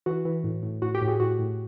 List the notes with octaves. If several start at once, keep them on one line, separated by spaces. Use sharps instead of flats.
E3 F#4
E3
A2
A2
A2 F#4
G4
A2
F#4 G#4
A2 F#4
A2